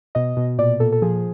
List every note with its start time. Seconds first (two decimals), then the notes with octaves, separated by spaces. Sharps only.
0.15 B2 D#5
0.37 B2
0.58 A#2 D5
0.80 A#2 A4
0.92 A4
1.02 F3 G#4